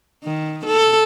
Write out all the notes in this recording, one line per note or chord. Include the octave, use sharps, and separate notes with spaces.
D#3
A4